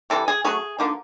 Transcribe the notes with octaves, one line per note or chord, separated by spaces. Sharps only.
C3 E3 G3 A4
G#4
F#3 A3 C#4 G#4
D3 F3 A#3 D#4